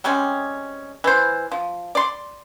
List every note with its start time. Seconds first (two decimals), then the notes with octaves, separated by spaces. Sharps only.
0.04 C3 G3 G#3 C#4
1.04 E3 C5
1.52 F3
1.95 D5 C6